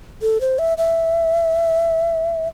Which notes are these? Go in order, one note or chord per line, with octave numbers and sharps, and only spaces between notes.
A4
C5
E5
E5